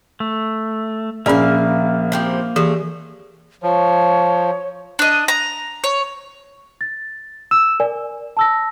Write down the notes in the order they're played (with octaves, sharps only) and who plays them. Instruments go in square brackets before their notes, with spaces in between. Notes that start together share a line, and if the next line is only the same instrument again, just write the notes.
[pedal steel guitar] A3
[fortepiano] A#1 G#5 [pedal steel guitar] A#3 [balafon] C#4 G#4 D5 [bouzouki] E5 F5
[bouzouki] F3 C4 G4
[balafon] E3 G4 [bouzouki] G#3 A3
[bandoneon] F3 [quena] C#5
[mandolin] D4 D#5
A#5
C#5
[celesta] A6
E6 E7
A#4 D5 G#5
A5 E6 A#6